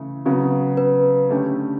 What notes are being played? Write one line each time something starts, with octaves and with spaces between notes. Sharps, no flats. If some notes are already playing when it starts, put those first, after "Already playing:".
Already playing: C#3 E3 A3
C#3 F#3 B3 F#4
B4
D3 A3 C#4 G4